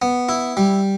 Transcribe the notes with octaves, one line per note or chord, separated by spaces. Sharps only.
B3
E4
G3